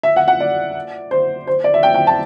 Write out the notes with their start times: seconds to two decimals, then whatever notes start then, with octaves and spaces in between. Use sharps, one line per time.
0.03 E5
0.16 F#5
0.28 F#5
0.40 D5
1.11 C5
1.47 C5
1.64 D5
1.74 E5
1.83 G5
1.95 G5
2.07 A5